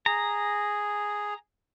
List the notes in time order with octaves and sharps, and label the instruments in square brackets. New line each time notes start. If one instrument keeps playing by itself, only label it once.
[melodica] G#4 [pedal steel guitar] A#5